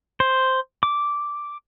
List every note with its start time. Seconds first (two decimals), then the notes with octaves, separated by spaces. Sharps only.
0.20 C5
0.83 D6